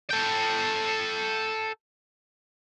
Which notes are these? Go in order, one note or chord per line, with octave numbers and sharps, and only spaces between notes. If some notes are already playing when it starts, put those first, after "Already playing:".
A4 G5